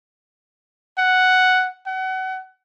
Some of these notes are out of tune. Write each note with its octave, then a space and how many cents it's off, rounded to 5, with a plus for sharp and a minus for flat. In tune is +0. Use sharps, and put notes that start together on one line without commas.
F#5 +0
F#5 +30